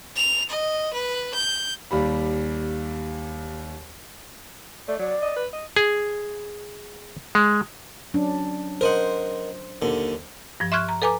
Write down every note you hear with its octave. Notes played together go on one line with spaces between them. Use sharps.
F7
D#5
B4
G6
D#2 G3 B5
A3 D5
F#3 D5
D#5
B4
D#5
G#4
G#3
F#3 C#4 D4
A#4 C5 D#5 F#5
D#2 D3
G2 F3
E5 C6 C#6 F6 F#6 G#6
A#5
A4 B4 G#5 A#5 D6